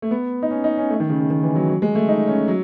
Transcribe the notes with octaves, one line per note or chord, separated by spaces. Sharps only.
A3
B3
D#4
C#4
D#4
C#4
A3
D#3
C#3
C#3
D#3
E3
F#3
F#3
G#3
A3
D#4
C#4
F#3